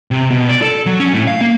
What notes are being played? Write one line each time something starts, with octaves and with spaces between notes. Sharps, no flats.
C3
B2
D5
A4
F#3
C#4
A2
F5
A#3